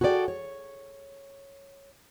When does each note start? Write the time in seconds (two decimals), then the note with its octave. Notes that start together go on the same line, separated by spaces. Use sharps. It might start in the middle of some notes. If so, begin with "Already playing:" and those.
0.01 F#4 G#4 A4 B4 D5 G5
0.28 C#5